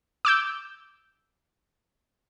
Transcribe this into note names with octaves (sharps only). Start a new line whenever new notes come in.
D6 E6 G6